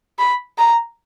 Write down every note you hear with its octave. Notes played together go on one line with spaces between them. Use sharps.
B5
A#5